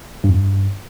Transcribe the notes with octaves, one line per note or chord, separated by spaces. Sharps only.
G2
F2
G2